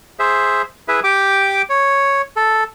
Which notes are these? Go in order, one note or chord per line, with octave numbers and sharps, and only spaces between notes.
G#4 C5 E5
E4 G#4 B4 E5
G4 G5 D6
C#5
A4